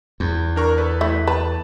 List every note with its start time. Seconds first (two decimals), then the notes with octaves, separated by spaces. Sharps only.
0.20 E2
0.56 D4 A#4 C#6
0.78 A4 B4
1.01 A3 E4
1.27 B4 A5